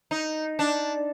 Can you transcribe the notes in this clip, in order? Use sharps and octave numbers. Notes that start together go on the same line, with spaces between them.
D#4
D4